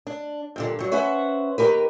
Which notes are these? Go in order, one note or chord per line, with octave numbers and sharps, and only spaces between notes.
D4
G2 A#2 D3
G2 F#3
C#4 B4 C5 E5 F#5
D#2 D#3 G4 A#4 B4